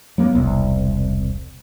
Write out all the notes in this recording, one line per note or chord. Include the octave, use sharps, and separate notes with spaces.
F#3 A#3 B3
E1 C2